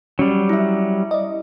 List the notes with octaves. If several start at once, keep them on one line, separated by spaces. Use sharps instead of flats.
F#3 G3 C#4
E4 E5
D5 D#5